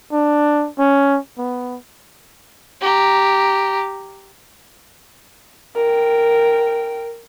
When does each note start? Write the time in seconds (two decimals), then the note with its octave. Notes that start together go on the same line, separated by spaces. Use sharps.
0.13 D4
0.78 C#4
1.38 B3
2.81 G4 A#5
5.76 A#4 G5